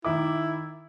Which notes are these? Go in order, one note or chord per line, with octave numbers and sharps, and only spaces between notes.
D#3 E4 E5 D6